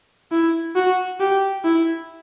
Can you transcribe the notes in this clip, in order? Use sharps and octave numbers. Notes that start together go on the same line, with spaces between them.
E4
F#4
G4
E4